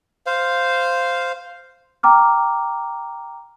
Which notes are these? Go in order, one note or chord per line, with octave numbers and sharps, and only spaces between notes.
C5 F5
G5 A#5 D6 F6